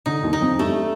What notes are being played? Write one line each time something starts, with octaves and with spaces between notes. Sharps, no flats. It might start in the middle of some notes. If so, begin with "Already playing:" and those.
D3 D#4
D#2 D#3
D#4
F2 F3
G2 G3 A3